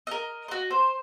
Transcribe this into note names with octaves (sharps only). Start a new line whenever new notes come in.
A#4 D#5
F#4 D#5
C5